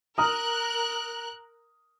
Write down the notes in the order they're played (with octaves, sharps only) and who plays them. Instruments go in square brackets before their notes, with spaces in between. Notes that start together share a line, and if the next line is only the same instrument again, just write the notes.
[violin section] A#4 F#6 [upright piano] A#5 D#6 F6